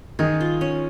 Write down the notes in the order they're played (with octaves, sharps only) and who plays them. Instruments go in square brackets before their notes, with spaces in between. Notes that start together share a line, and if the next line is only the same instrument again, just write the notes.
[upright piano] D#3 D#4 [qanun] G#4
[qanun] F4
C#4